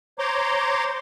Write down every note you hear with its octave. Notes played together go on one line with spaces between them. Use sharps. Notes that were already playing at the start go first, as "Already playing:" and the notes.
C5 C#5 A#5 C6 D6